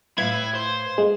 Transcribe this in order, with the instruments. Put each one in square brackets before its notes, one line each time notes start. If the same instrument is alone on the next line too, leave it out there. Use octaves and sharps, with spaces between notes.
[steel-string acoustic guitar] A2 B4 F5 [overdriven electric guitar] E4 [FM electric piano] G#6
[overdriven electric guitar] C5
[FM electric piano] G#3